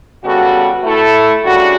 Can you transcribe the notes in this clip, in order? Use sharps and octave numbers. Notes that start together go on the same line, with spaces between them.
C#3 G3 B3 F#4 A4
A3 E4 A4
C#3 G3 D4 F#4